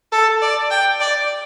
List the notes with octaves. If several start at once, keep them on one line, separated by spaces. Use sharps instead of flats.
A4
D5
G5
D5